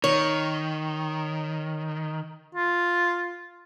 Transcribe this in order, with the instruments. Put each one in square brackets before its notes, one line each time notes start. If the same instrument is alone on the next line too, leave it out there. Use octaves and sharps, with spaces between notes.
[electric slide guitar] D#3 [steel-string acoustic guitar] C#5
[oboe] F4